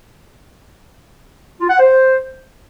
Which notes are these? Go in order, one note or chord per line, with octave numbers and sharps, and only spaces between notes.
F4
F#5
C5